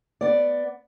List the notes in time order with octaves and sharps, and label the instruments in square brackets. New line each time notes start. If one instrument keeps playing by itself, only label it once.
[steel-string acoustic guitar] B3 D5